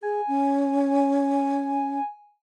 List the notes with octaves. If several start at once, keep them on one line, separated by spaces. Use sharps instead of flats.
G#4 G#5
C#4